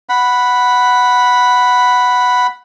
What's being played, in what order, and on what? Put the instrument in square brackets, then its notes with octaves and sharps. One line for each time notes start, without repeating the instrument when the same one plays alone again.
[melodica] F#5 B5